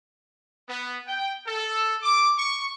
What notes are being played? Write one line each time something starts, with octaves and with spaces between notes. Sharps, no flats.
B3
G5
A4
D6
C#6